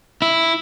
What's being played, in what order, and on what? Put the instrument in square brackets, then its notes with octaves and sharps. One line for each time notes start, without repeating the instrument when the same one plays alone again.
[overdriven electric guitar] E4